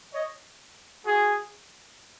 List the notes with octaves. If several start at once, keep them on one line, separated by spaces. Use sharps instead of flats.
C#5 D#5
F#4 G#4